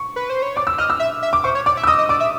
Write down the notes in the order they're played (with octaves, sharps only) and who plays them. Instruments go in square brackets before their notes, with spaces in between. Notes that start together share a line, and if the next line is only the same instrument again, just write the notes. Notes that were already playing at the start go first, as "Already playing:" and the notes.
Already playing: [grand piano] C#6
[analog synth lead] B4
C5
C#5
[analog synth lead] D5 [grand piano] D6
[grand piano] E6
[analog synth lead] D#5 [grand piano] F6
[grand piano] E6
[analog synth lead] E5
E5
[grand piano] D6
[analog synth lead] C5 [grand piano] C#6
[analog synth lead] C#5
[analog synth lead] D5 [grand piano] D6
[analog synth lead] E5
[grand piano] E6
[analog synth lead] D#5 [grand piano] D#6
[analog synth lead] D#5
[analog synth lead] D5 [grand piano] D6
[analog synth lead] E5